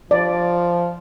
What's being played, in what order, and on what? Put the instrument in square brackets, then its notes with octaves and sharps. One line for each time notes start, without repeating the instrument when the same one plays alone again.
[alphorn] F3 [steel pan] D5